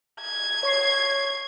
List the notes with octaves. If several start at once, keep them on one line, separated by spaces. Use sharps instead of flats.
G#6
C#5 C#6 C7